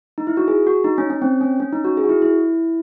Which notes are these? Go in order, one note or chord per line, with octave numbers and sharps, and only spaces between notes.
D#4
E4
F#4
G#4
F#4
D#4
C#4
C#4
C4
C#4
C#4
D#4
F#4
G#4
F#4
E4
E4